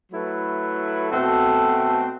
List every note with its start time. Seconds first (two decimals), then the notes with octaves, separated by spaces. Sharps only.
0.12 F#3 A3 E4 B4
1.10 B2 A3 C4 F#4 A4